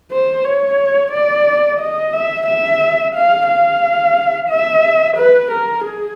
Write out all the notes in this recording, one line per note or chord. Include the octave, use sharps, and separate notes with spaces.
C5
C#5
D5
D#5
E5
E5
F5
F5
E5
B4
A#4
G#4